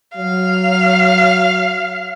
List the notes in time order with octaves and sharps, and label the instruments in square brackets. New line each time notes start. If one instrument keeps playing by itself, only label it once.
[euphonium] F#3 [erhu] F5